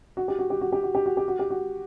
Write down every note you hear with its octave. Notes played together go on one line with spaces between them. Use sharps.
F#4
G4
F#4
G4
F#4
G4
F#4
G4
F#4
G4
F#4
G4
F#4